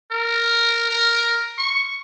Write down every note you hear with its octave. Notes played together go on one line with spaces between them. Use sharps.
A#4
A#4
C#6